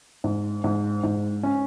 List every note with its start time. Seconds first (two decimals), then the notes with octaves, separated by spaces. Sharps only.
0.24 G#2
0.64 G#2
1.04 G#2
1.43 C#4